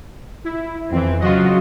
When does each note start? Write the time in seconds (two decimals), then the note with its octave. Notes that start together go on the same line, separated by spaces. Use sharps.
0.44 E4
0.91 F2 E3 C4
1.20 C#3 F#3 F4 F#4 D#5